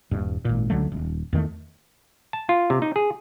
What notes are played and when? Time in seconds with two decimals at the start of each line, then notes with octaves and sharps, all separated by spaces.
0.11 D#1 G2
0.45 G#1 A#2
0.70 C#2 D3 F#3 A3
0.92 D#1
1.33 E2 D#3 G#3 A3
2.33 A5
2.49 F4
2.70 C3
2.82 D#4
2.96 G#4